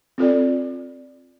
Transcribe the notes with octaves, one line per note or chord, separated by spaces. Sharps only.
C4 F4 A4 D5